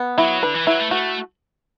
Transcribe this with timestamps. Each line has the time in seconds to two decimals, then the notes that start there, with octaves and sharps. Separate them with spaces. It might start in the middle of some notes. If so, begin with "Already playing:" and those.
Already playing: B3
0.18 F#3 E4
0.43 D3 B4
0.54 E3
0.67 F#3 E4
0.79 A3
0.91 A3 F#4